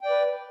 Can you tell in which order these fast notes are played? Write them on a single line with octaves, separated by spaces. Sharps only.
G5 D5 B4